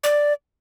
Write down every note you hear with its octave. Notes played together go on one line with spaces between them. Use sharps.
D5